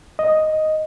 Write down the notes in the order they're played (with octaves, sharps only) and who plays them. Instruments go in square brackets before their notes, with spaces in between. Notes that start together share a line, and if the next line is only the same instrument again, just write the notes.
[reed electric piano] D#5